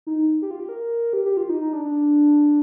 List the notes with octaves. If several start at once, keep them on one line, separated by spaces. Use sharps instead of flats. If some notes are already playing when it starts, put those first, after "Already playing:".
D#4
G4
F4
G4
A#4
G4
G4
F4
D#4
D#4
D4
D4